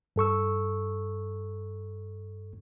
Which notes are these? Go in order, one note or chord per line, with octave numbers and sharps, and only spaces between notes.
G2 A4 C#6 E6